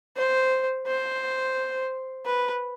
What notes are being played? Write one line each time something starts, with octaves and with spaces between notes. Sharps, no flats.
C5
C5
B4